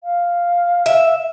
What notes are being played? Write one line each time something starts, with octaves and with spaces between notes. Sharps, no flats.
F5
E5